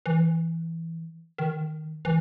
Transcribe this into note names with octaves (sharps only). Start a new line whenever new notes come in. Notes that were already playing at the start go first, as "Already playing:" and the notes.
E3
D#3
E3